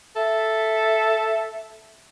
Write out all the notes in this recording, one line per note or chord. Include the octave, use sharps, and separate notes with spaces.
A4 E5